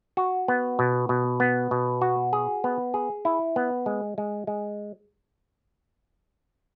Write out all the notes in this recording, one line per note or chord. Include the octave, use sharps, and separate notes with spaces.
F#4
B3
B2
B2
B3
B2
F#4
G#4
B3
G#4
E4
B3
G#3
G#3
G#3